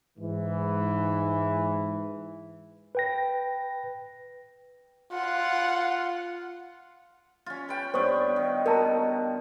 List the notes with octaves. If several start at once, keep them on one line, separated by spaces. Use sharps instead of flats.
G#2 E3
B4 G5 A#6
F4 F#5
C#4 F4
B4 G5
G2 B3 C5 C#5 C#6
D#3
B2 A#4 A5 A#5